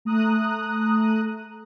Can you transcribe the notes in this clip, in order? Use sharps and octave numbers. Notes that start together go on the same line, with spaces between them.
A3 A#5 D#6 F#6